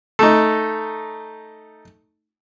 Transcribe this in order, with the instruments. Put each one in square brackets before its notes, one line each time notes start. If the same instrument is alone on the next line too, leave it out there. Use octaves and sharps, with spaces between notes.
[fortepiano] A3 D#4